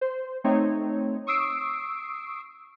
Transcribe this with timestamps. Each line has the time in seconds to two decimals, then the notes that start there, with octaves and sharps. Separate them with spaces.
0.01 C5
0.44 A3 C4 D#4 C#5
1.27 C#6 D#6 E6 C7 D7